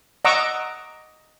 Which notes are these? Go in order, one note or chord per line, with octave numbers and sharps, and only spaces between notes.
D#5 F#5 A#5 C#6 D6 E6